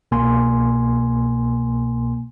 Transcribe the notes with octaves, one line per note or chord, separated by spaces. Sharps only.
C2 B2 A#3 G#5 C6